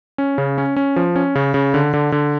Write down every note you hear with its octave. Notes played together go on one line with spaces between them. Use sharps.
C#4
C#3
C#4
C#4
F3
C#4
C#3
C#3
D3
D3
D3